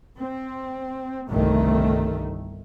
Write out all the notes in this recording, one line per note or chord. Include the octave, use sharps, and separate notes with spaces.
C4
G1 C2 D#3 A3